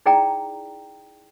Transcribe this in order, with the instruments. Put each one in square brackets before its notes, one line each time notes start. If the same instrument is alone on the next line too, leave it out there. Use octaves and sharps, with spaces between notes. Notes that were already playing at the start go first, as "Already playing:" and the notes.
[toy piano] D#4 E4 G#4 D5 G5 A#5